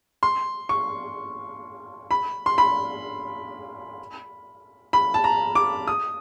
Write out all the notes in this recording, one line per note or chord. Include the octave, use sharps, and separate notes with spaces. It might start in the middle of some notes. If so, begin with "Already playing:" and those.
C6
C#6
B5
C6
B5
B5
A5
A#5
D6
D#6